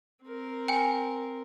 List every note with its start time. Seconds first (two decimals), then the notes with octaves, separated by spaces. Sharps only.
0.24 C4 A#4
0.68 G5 G#5